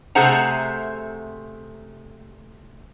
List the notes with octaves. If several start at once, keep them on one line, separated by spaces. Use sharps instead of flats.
C3 A3 G#4 C5 F#5 A#5